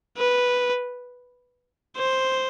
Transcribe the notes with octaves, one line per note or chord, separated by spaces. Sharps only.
B4
C5